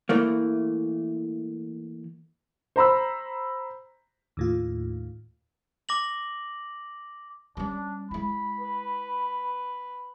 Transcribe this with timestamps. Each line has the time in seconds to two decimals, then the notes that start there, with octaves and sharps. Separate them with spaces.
0.09 E3 A3 A#3
2.76 C5 A#5 B5 E6
4.37 D#2 A2 F4
5.89 D6 A#6 F#7
7.57 G3 C#4 D4
8.11 G#3 E4 B5
8.60 B4